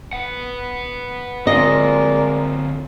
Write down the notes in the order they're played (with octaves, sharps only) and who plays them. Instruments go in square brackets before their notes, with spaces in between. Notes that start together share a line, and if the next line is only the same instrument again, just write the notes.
[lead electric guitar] B4 F#5
[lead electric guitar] D3 C4 [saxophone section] G#3 A#4 D5 [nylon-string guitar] F4 D#5